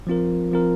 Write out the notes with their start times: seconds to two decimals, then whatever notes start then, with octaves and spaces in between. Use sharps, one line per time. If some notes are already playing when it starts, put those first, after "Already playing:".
0.07 F3 C4 F4 A#4
0.51 F3 C4 F4 A#4